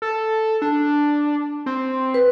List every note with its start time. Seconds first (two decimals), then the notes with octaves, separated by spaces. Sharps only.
0.02 A4
0.62 D4
1.66 C4
2.14 B4